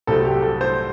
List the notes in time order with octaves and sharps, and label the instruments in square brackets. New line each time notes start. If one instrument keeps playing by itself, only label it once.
[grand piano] C2 C3 F#3 A3 A4
G4
A4
C5